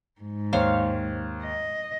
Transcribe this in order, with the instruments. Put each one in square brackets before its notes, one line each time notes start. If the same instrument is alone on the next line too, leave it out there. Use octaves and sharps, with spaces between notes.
[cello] G#2
[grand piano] D#2 [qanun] C5 C#5 F5
[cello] D#5